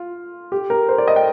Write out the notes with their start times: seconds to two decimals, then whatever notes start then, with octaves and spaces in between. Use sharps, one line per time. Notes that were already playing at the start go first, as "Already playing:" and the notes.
Already playing: F4
0.52 G4
0.70 A#4
0.89 C5
0.98 D5
1.08 D#5
1.16 G5